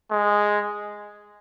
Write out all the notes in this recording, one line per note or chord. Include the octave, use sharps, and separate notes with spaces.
G#3